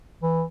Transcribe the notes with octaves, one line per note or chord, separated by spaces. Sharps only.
E3